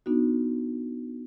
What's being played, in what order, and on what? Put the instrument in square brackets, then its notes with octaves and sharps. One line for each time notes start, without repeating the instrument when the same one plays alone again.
[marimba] B3 D4 D#4 F#4